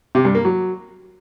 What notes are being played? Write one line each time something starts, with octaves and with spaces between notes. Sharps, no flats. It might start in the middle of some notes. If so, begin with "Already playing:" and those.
C3
G2
A#3
F#3